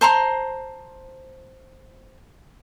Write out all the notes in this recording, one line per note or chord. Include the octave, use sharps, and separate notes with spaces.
C5 A5 A#5 C6